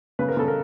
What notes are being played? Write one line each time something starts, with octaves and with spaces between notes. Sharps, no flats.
C#3 B4
A#4
C#3 A4
A#4